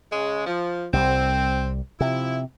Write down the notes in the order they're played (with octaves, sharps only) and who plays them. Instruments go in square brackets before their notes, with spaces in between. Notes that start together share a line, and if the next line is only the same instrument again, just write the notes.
[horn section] C#3 G#3
F3
[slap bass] C2 G3 [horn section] C4
[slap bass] C3 [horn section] F3 E4